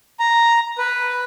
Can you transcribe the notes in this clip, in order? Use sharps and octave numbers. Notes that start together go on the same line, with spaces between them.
A#5
B4